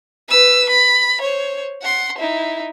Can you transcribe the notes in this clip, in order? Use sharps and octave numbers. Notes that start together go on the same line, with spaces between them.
B4 E6
B5
C5 C#5
F#5 C6
D#4 E4